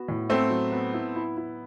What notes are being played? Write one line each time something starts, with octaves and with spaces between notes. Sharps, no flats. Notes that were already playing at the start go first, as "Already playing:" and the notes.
Already playing: B3 F#4
A2
A3 B3 C4
F#3
B3
E4
E4
E4